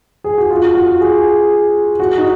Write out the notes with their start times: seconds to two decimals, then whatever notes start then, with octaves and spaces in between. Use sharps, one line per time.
0.24 G#4
0.38 F#4
0.50 F4
0.75 F#4
1.00 G#4
2.00 F#4
2.18 D#4